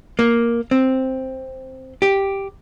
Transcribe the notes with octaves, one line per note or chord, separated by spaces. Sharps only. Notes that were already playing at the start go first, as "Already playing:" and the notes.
A#3
C4
G4